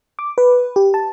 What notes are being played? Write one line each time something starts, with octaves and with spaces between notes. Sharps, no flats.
D6
B4
G4
A5